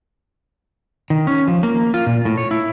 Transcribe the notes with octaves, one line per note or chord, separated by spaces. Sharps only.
D#3
C#4
F3
A#3
F4
A#2
A2
C#5
E4